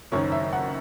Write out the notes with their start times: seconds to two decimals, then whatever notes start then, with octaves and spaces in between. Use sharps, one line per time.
0.12 F#1 F#2 D#3 C#5
0.32 E5
0.53 F#5